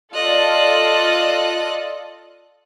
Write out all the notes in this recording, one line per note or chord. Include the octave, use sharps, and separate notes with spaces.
F4 A4 D5 D#5 F#6